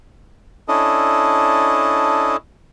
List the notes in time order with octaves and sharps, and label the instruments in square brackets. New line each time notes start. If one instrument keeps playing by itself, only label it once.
[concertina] C#4 D4 E4 A4 D#5